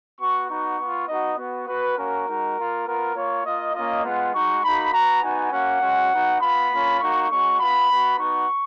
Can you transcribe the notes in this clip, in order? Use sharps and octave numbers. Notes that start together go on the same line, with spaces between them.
B3 F#4 C#6
B3 D#4 F#4 C#6
B3
F4
B3 D#4 F#4 D#5
B3 F#4
B3 F#4 B4
A#3 C#4 F#4 A#4
G#3 D#4 F#4
A#3 F4
B3 F4 A#4
A#3 F4 C#5
A#3 F4 D#5
A#3 C#4 F4 D#5
G#3 B3 F4 F#5
G#3 D#4 F#4 C#6
A#3 D#4 F#4 B5
B3 F#4 A#5
B3 D#4 F#4 G#5
A#3 C#4 F#4 F#5
G#3 C#4 F#4
B3 D#4 F#4
B3 F4 B5
A#3 C#4 F4
A#3 D#4 F#4 C#6
G#3 C#4 F#4 C#6
B3 F4 B5
B3 F#4
B3 D#4 F#4 C#6